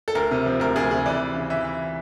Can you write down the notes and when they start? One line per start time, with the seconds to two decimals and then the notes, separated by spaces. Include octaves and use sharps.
0.08 A4
0.15 D2 A#4
0.31 C3
0.46 F3
0.60 D2 A#4
0.76 D2 G#4
0.91 C3 G#4
1.06 E3 D5
1.21 E3
1.35 C#3
1.50 E3 E5
1.64 E3